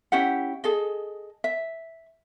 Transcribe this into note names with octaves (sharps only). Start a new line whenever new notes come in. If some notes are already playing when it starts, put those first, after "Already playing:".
C#4 E4 G4 F#5
G#4 A4 D#5
E5